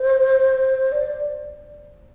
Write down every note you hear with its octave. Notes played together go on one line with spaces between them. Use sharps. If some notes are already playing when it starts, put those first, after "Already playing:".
Already playing: C5
D5